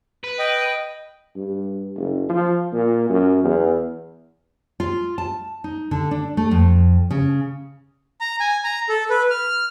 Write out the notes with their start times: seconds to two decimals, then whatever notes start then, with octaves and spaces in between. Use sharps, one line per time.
0.24 B4
0.39 D#5 G5
1.36 G2
1.97 F#1
2.29 F3
2.73 A#2
3.10 F#2
3.44 E2
4.80 F4
5.18 A5
5.64 D#4
5.91 D3
6.11 D4
6.37 A3
6.51 F2
7.11 C#3
8.21 A#5
8.40 G#5
8.64 A#5
8.89 A4
9.10 B4
9.30 F6